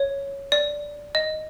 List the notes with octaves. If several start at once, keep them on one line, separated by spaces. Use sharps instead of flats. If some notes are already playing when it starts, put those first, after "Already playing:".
Already playing: C#5
D5
D#5